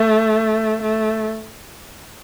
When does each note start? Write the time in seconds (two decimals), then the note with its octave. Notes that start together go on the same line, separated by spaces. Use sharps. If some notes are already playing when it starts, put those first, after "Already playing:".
Already playing: A3
0.82 A3